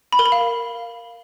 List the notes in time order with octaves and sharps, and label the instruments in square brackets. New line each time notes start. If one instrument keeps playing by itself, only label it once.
[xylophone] B5
A#4
B5
F5